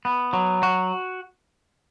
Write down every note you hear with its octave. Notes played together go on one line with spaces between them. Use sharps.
B3
F#3
F#4